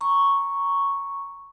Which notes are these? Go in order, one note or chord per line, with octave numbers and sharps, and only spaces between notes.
A#5 C#6